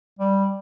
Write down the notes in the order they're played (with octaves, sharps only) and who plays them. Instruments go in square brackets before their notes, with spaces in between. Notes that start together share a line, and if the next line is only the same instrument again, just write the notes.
[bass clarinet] G3